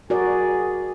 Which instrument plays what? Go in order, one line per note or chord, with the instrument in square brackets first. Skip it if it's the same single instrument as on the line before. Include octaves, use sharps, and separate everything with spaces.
[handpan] F#4 A#4 D5 [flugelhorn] G#4